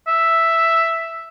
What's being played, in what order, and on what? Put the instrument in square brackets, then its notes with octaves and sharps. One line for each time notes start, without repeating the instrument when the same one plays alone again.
[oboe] E5